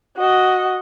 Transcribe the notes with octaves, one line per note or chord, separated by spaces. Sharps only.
F#4 D#5